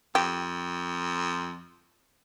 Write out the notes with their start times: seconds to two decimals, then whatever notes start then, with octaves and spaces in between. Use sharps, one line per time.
0.15 F2 G4